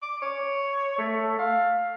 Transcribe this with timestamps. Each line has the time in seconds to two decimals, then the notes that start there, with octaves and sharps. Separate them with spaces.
0.03 D6
0.22 C#5
0.99 A3
1.39 F5